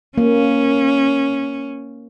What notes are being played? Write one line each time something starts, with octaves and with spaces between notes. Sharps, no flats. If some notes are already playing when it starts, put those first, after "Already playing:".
A#3 C#4